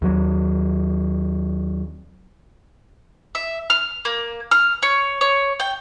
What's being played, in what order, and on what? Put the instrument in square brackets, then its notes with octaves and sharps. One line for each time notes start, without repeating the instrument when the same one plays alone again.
[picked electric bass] D#2 F#3
[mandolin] E5
F6
A#3
F6
C#5
C#5
G5